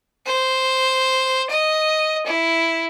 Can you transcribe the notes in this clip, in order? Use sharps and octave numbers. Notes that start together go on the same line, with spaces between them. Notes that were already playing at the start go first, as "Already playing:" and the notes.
C5
D#5
E4